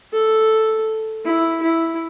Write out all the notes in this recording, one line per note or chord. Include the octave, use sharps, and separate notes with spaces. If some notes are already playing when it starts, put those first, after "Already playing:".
A4
E4
E4